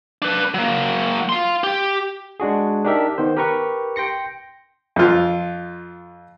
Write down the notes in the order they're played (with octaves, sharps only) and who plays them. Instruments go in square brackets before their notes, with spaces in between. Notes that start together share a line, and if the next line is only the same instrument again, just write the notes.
[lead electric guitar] D4 B4
F#3 A#3
F5 C6
G4
[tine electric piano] G#3 D4 F#4 G#4
D4 D#4 G4 A#4 E5
D#3 B3 C5
G4 A#4 B4 A#5 C#6
G5 C6 A#6 C#7
[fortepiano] F2 F4